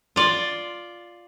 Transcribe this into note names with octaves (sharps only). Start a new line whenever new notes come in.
F4 D5